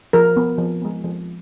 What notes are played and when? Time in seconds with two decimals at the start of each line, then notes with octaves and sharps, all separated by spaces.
0.13 F3 A#4
0.37 B3
0.58 F3
0.82 G#3 B3
1.04 F3